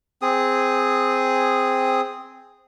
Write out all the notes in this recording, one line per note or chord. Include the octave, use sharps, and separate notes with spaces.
C4 G#4 D#6